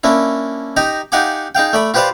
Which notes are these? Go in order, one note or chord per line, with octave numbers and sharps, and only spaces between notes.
A#3 C#4 D4 E4
D#4 G4 D#5 A#5
D#4 G4 F5 F#5 G#5 D6
D#4 G#4 F5 G5
A3 D5 B5
F4 G4 B4 C5 D5 F5